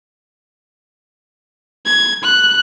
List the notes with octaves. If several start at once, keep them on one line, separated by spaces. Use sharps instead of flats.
G#6
F#6